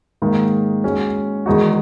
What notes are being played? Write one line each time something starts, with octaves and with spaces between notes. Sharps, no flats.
G#2 D#3 A#3 D#4
G#3 C#4 F#4 C#5
E2 D#3 G#3 D#4 F#4